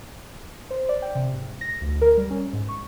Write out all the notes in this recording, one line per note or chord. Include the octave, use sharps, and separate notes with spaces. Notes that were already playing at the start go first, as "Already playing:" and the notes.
C5
D5
G5
C3
G#2
A#6
D2
A#4
G3
C#4
G#2
C#6